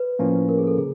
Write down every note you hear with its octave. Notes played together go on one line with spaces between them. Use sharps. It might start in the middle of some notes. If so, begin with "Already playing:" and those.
Already playing: B4
A2 F3 A#3 C#4
A#4
G#4
A#4
A4
C#3 G#4